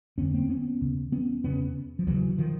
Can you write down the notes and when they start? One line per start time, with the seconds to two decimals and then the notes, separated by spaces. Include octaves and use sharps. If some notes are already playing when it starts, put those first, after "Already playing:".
0.18 F2 D3 B3 C#4
0.34 A#3 C4
0.49 B3 C#4
0.81 D#2 C#3
1.12 B3 C#4
1.44 E2 C#3 B3 C#4
1.99 F3
2.07 D#2 C#3 E3 F#3
2.38 D#3 F3